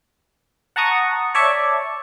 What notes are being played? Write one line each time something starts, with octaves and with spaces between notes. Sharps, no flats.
F#5 A5 A#5 C#6 D#6
C#5 D5 E5 A5 C#6